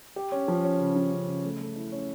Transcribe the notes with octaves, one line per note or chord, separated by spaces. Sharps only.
G4
C#4
F3
C#4
C#3
F3
C#3
C#3
A3
A3
E4
C#4